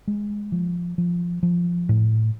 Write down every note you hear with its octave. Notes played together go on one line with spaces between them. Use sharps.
G#3
F3
F3
F3
A2